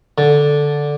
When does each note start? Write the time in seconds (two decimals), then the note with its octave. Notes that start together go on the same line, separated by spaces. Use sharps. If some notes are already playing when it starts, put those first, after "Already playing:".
0.18 D3